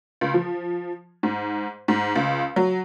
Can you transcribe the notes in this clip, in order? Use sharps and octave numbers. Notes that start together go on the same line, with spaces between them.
C#2
F3
G#2
G#2
C#2
F#3